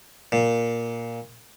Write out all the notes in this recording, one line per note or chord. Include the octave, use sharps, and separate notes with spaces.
A#2